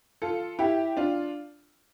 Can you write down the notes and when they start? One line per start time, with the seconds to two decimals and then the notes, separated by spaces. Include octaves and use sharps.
0.22 F4 A4
0.59 E4 G4
0.97 D4 F4